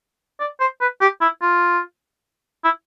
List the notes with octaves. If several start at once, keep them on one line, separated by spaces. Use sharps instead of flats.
D5
C5
B4
G4
E4
F4
E4